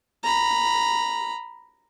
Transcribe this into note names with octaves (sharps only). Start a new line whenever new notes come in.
A#5 B5